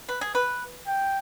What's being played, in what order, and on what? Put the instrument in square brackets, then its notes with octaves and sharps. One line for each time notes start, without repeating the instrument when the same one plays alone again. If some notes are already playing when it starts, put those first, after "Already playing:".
[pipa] B4
G#4
B4
[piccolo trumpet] G5